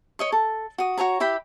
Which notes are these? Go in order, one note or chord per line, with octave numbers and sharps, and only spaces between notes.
C#5 D#5 C#6
A4
F#4 D#6
F#4 G#4 C#5 A#5
E4 G4 G5 B5